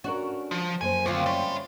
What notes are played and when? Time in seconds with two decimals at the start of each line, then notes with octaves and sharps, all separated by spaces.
0.04 C#4 D4 F#4 A#4
0.51 F3
0.81 F#2 A#3 C5 G#5
1.06 D2 C4 F4
1.26 G3 C#4 E5 C6